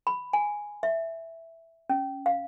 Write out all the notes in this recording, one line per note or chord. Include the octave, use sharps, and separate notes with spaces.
B5
G#5
E5
C#4
F5